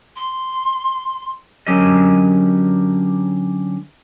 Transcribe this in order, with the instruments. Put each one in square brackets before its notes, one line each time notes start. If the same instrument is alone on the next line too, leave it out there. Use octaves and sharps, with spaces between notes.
[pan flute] C6
[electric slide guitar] D3 F#3 C#4 G4 A#4 D#5